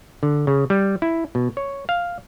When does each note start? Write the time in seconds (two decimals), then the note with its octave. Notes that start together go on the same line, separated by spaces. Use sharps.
0.23 D3
0.47 C#3
0.70 G3
1.02 E4
1.35 B2
1.57 C#5
1.89 F5